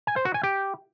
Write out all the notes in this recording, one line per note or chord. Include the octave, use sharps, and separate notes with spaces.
G#5
C5
F#4
G#5
G4